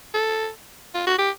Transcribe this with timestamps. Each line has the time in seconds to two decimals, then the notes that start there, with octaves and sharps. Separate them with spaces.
0.14 A4
0.94 F4
1.07 F#4
1.19 G4